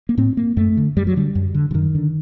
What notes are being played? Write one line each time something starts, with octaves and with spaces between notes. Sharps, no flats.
A#3
A2 C4
A#3
F#2 A3
D3
F#2 G3
F#3
D3 G3
F#2
D3
D3
F#2 D#3
D3